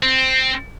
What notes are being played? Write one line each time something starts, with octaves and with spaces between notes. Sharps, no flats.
C4